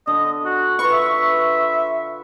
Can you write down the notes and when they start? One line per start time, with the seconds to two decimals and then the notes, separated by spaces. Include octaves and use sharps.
0.07 D3 D#5
0.45 F#4
0.79 F4 B4 C#6
0.93 E5